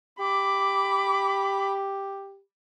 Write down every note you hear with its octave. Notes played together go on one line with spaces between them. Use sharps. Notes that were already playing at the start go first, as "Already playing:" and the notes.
G4 B5 D6